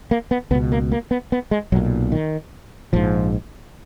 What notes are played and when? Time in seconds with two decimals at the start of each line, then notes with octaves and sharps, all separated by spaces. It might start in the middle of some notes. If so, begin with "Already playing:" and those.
0.11 A#3
0.31 B3
0.51 C#2 B3
0.55 B2
0.72 A#3
0.92 A#3
1.11 B3
1.32 B3
1.51 G#3
1.72 B1 A#2 F#3
2.12 D#3
2.93 A#1 G#2 F3